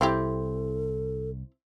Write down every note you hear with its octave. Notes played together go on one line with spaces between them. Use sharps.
C2 C4 E4 G4 A4